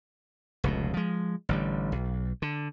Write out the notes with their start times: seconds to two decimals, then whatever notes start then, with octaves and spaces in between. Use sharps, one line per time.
0.64 F1 C#2 B2
0.94 F3 G#3
1.49 A1 D3 G3
1.92 B1
2.42 D3